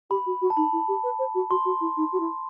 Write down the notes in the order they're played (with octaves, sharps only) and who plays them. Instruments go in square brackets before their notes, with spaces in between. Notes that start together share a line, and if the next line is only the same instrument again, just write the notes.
[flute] G4 [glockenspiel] B5
[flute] F#4
F#4
[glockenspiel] A5
[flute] D#4 [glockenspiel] B5
[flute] E4
G4
B4
C5
F#4
[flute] F#4 [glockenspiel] C6
[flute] F#4
E4
D#4
F#4
E4